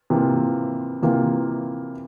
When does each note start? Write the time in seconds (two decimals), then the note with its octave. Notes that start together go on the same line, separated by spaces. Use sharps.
0.10 C3 E3 A#3 F4
1.02 C3 E3 A#3 F4